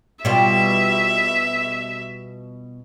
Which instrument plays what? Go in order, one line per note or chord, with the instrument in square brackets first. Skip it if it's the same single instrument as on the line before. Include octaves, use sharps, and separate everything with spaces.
[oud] B2 G3 F4 [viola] E5